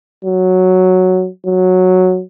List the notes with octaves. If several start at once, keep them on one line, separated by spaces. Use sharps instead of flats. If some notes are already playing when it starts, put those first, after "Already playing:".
F#3
F#3